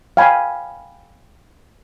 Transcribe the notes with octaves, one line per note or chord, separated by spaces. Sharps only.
F5 G5 G#5 B5